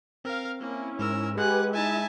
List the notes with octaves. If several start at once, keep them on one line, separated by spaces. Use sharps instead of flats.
C4 A#4 F5
A#3 C#4 E4
G#2 A#4 E6
G#3 G4 B4 F#5 G#5 F#6
D#4 E4 E5 G#5 A5